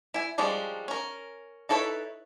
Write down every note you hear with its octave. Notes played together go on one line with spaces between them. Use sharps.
E4 G#5
F3 G3 G#3 C#4 D4
C#4 A#4
D#4 E4 A4 B4 C#5